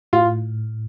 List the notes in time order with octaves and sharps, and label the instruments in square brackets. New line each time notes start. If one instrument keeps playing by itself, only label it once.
[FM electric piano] A2 [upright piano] F4